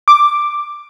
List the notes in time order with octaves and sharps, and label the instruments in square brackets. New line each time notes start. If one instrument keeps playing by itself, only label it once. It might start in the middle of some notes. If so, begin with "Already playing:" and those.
[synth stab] D6